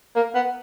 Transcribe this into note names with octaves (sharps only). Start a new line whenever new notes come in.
A#3
B3